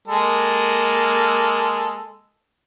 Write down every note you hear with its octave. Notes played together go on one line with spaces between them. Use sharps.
G#3 A#3 A4